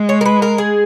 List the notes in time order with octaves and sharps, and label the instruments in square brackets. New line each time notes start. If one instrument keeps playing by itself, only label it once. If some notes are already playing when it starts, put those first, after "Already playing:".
Already playing: [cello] G#3
[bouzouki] C#5
A#4
B4
A#4
G#4